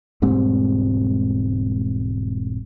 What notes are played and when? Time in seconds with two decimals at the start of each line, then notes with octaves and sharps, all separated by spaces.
0.22 E1 G#2 G3 C4